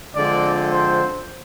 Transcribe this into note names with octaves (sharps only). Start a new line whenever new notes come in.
D3 F3 G#3 C4 D5
C5